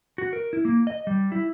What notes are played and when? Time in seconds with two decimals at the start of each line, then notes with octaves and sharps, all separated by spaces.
0.18 F#4
0.33 A#4
0.53 E4
0.65 A#3
0.87 D#5
1.07 G3
1.32 E4